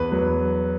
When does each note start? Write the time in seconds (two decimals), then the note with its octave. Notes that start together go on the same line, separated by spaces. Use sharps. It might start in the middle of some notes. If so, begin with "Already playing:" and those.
Already playing: E2 B4
0.12 F#3